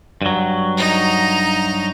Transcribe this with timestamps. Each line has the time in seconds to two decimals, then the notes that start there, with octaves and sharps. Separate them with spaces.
0.22 G2 F#3
0.77 D#4 A#5